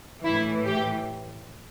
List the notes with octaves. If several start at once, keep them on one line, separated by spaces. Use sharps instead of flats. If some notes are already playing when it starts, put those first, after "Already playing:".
A2 E3 E4
G4